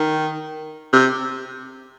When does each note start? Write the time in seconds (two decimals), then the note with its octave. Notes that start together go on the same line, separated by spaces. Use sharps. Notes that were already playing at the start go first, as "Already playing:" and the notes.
Already playing: D#3
0.93 C3